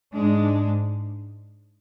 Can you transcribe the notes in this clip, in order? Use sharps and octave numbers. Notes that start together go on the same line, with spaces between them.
G#2 G#3 D4